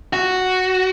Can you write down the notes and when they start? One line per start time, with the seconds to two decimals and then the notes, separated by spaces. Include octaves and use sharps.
0.13 F#4